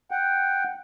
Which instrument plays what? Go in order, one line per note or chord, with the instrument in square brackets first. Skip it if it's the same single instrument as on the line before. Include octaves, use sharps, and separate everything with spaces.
[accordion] F#5 G5